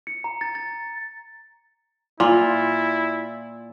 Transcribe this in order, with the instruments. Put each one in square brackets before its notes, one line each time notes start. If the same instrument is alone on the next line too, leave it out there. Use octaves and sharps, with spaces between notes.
[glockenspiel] C#7
A#5
A6
A6
[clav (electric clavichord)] A#2 [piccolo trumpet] E4 [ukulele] F4